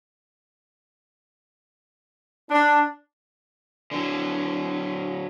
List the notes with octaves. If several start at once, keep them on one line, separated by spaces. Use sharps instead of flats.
D4
D3 F#3